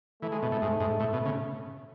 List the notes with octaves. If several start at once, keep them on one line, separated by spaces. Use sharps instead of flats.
E3 A3
G#3
B2
A2
G#2
G#2
A2
B2
C#3